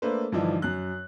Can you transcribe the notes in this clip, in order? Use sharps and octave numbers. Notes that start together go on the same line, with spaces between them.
A3 A#3 D4 A4 B4 C5
G2 D3 E3 F3 D4 D#4
F#2 F#6